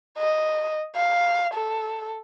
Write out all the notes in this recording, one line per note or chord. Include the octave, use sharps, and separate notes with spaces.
D#5
F5
A4